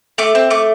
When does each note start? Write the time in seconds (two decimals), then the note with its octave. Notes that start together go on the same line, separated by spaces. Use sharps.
0.18 A3 D6
0.35 C4
0.50 A3 D6